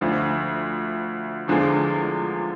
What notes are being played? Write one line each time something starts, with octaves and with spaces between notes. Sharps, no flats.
D2 D3 F3
E2 D3 F3 G#3